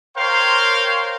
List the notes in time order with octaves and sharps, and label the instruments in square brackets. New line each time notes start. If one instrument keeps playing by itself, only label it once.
[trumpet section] A#4 C5 C#5 F5 G5 C6